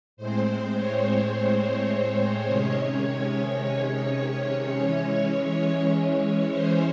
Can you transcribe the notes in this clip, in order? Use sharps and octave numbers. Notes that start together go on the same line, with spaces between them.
A2 G#3 C4 C5
C#5
C5
C5
C3 D#3 G#3 C#4 C#5
E3 G#3 C#4
C#5
C5